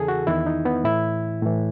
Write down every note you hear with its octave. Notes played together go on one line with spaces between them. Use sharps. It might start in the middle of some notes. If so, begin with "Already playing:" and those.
Already playing: E2 C#3 E3 G#4 A4
F#4
E2 D#3 E4
D#4
B3
A2 E3 E4
A2 E3